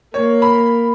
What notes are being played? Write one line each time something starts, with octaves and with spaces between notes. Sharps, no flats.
A#3 C#5
B5